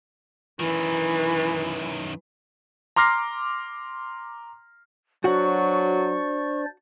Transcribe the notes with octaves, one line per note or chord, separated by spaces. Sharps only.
F#2 D#3 E3
A#5 C6 D6 F6 A#6 C7
F#3 D4 F#4 C5 D5 F#5 C#6